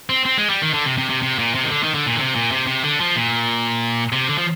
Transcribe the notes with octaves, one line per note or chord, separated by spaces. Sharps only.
C4
C4
G#3
G3
D#3
D3
C3
C3
C3
C3
A#2
C3
D#3
D3
D#3
D3
A#2
D3
C3
A#2
C3
C3
D3
F3
A#2
C3
D3
F3